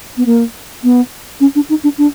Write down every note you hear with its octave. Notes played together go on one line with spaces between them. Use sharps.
B3
A#3
B3
C#4
D4
D#4
D4
D4